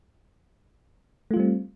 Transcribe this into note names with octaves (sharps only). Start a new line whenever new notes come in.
G3 A3 C4 F4